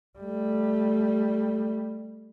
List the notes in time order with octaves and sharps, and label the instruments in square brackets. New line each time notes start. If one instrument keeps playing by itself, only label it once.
[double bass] G3 A3